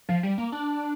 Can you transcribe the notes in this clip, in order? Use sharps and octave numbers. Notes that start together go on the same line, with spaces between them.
F3
G3
A#3
D4